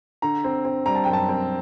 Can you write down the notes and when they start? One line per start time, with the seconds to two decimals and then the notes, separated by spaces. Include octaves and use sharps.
0.22 D3 A#5
0.44 C4
0.65 C4
0.86 G3 A#5
0.95 A5
1.04 F#2 G5
1.13 A5
1.29 C4